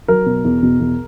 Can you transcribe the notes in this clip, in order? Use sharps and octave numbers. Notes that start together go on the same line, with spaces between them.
F#3 A#4
B2
E2
B2
E2